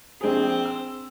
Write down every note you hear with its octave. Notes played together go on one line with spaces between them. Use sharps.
A#1 C4 G#4 C5
E6